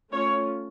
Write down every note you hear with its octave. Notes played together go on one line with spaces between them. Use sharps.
A3 C#4 F4 C#5